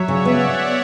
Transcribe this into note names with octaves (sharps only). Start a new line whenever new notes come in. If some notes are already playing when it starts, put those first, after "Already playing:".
Already playing: F#3 C#5 E5
C#3 D5 F#5
B3